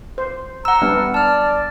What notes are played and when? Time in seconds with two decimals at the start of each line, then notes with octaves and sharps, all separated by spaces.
0.18 C5
0.65 F#5 A#5 E6
0.82 G3 B3 D4 F6
1.14 D5 A5 F6